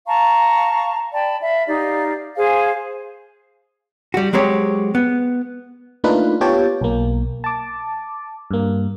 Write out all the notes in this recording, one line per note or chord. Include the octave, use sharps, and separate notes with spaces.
F5 A5 A#5 C#6
D5 G5 A5 B5
E5 F5 B5
D#4 G4 D5 F5
G#4 C5 F5 G#5
G3 F#4
F#3 G#3 C4 G4 C#5
B3
A3 A#3 D4 D#4 F4 B4
B3 F4 G4 C#5 G5 A5
B1 A#3
A5 D6
G2 A#3